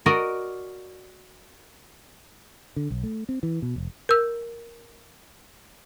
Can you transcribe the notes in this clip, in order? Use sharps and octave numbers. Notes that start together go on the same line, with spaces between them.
F#4 A#4 D5 D#5
D3
B1
A3
C4
E3
B2
F1
A#4 E6